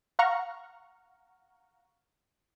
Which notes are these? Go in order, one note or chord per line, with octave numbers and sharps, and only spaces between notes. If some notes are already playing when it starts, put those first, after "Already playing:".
F5 F#5 A#5 C#6 F6